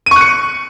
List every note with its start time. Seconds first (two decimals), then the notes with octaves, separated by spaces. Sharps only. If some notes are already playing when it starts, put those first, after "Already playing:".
0.06 D#7
0.11 C#6
0.16 F#6
0.21 C#7